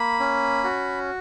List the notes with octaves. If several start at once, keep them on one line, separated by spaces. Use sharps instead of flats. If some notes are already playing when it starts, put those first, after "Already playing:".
Already playing: A#3 B5
C#4
F#4